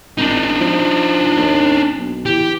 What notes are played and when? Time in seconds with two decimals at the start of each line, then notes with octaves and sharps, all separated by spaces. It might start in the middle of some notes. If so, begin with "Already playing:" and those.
0.18 G#1 D4 D#4
0.60 F3
1.36 D#2
1.97 B1
2.26 E3 G4